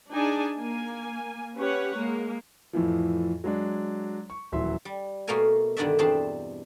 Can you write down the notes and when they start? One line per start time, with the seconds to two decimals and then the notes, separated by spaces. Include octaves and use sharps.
0.12 D4 D#4 G#4 D5 G#5 A5
0.58 A#3 G#5
1.56 C#4 G4 B4 C#5 F#5
1.96 G#3 A#3
2.73 F2 A2 E3 F3
3.44 F#3 G#3 D4
4.30 C#6
4.52 D#1 E3 F#3 E5 C6
4.85 G3
5.27 B2 A3 A#3 A4 A#4 G#5
5.77 G2 D3 D#3 D4 D5 E5
5.99 E2 B2 C4 D4 A5 C6